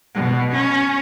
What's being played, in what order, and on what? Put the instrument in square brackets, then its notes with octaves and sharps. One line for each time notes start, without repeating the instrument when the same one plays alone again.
[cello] B2
C#4